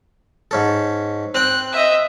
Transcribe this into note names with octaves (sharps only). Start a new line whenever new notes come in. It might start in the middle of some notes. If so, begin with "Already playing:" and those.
G#2 C#4 A4
C4 G5 F#6
D#5 E5